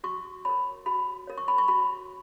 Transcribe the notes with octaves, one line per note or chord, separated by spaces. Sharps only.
F#4 C#6
A#4 C#5 B5
F#4 B5
A#4 C#5
C#6
B5
C#6
F#4 B5